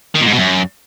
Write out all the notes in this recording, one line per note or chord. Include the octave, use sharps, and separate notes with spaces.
D#3
A#2
G#2
B2
F#2